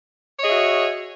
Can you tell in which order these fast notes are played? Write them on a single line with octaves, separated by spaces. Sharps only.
C#5 D#5 G#4 E5 F#4